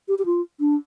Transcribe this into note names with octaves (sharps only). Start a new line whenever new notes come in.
G4
G4
F4
D4